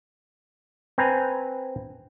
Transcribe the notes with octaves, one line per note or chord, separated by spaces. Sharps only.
C4 B4 G#5 A#5